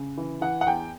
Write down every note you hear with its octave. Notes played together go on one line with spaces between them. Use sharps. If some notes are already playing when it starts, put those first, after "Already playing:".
Already playing: C#3
E3
E3 F#5
F#5
E2 G5